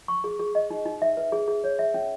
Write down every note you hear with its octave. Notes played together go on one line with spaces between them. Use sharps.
C#6
G#4
G#4
D#5
D#4
D#4
E5
B4
G#4
G#4
C#5
E5
C#4